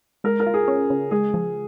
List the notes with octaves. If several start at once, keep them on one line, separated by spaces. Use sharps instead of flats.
G#3 A#4
A#4
F4
G#4
C#4
C#3
G#3 G#4
F3